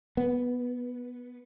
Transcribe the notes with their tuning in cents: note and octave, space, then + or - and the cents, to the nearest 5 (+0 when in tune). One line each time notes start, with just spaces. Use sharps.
B3 -5